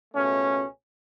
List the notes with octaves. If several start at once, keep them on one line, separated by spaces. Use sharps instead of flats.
C#2 B2 A3 C#4